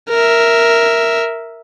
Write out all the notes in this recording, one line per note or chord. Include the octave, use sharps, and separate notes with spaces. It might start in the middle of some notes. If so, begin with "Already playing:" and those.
A#4 E5